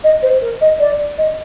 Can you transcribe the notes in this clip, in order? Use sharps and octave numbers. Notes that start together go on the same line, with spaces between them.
D#5
C5
A#4
D#5
D5
D#5